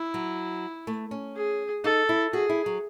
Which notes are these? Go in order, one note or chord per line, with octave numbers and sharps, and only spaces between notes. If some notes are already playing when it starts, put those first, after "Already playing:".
Already playing: E4
F#3
A3
C#4
G#4
D#4 A4
E4
F#4 G#4
E4
F#3